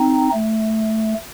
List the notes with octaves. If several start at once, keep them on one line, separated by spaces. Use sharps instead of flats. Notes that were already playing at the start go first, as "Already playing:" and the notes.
Already playing: C4 D#4
A3